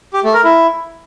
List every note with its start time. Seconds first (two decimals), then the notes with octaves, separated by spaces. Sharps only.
0.14 G4
0.24 A3
0.34 A#4
0.44 E4